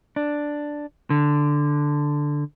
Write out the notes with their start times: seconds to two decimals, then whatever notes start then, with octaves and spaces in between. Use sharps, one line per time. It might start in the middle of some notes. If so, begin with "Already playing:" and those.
0.16 D4
1.10 D3